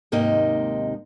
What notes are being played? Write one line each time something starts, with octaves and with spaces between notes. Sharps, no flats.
D#2 G#2 C3 A#3 D#4 D#5